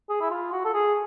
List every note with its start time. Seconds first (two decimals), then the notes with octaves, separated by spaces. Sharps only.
0.09 G#4
0.21 E4
0.30 F4
0.52 F#4
0.65 A4
0.73 G#4